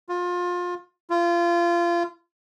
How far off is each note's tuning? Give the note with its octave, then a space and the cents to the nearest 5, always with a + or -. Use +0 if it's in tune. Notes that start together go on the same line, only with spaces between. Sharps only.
F4 +25
F4 -25